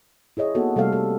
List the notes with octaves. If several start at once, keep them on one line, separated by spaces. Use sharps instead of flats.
E4 G#4 C#5 D#5
A#3 B3 D#4 F#4 A4
C3 G3 A3 A4 F5
A4